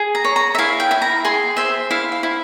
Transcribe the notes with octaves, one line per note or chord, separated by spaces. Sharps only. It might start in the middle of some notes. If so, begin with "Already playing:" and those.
Already playing: G#4
A#5
C#5
A#5
E5
E4 F5
G5
E4
A#5
G#4 C6
C5 E5
E4 F5
F5
E4